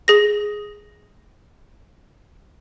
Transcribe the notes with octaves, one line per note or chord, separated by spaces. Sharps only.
G#4 A#6